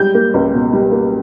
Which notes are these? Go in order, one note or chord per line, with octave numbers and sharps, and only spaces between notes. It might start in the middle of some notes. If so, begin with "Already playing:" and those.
Already playing: G3 G#3 G6
A#3
C#2
B2
G3
A#3